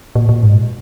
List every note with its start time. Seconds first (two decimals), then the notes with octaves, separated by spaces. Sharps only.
0.15 A#2
0.29 A#2
0.43 G#2